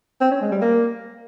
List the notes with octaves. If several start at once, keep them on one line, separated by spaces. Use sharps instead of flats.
C4
C#4
G#3
G3
A#3